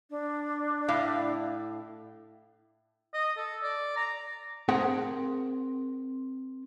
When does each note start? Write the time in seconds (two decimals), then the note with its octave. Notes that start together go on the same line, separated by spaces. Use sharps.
0.10 D4
0.88 A2 E4 F5
3.14 D#5
3.37 A4
3.63 D5
3.96 A#5
4.68 C4 G#4 A#4 F#5 G5 A5